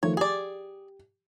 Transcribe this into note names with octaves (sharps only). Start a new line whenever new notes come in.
D#3 F3 A3 C#5
G4 G#4 D5